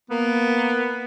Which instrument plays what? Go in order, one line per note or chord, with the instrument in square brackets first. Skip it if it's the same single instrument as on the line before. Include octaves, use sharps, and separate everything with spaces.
[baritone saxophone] A#3 [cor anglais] B3